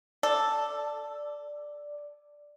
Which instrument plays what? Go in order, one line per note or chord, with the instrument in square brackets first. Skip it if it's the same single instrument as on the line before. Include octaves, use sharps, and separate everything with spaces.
[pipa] A4 [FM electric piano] D5